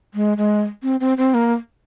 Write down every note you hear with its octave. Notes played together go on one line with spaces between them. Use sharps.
G#3
G#3
C4
C4
C4
A#3